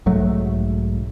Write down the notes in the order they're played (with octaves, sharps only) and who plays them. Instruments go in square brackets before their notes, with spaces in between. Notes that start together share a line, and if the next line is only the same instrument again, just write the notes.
[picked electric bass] B1 G#2 F#3 A3